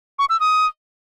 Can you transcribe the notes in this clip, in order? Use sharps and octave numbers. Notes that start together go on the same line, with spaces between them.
C#6
E6
D#6